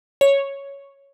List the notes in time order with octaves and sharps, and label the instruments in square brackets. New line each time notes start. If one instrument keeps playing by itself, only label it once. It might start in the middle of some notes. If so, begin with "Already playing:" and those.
[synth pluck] C#5